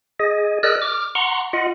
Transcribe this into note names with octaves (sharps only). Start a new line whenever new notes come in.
G#4 D#5
G#4 A#4 D5 D#5 E6 F#6
D6 F6
F#5 A#5 C6 C#6
F4 D#5 F#5